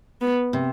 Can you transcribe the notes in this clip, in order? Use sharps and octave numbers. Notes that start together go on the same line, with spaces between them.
B3
C3